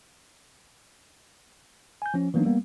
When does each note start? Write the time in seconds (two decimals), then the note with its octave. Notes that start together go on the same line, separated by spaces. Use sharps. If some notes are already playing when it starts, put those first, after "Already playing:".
2.02 G#5 G6
2.14 F3 C#4
2.34 E3 F#3 A#3 B3 D4 D#4
2.45 G3 A#3 B3